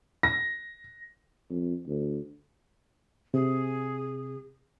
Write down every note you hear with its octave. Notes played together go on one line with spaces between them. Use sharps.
A#6
F2
D2
C3 G#4